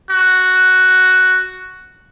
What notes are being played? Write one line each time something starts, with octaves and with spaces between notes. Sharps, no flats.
F#4